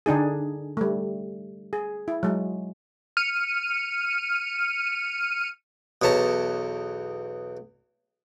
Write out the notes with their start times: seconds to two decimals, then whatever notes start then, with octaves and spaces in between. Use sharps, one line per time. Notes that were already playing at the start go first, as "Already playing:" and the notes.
0.06 D3 D4 D#4 G#4
0.77 G3 A3
1.73 G#4
2.08 E4
2.23 F#3 G#3
3.17 F6 C#7 D#7
6.02 B1 E2 C#5 A5 A#5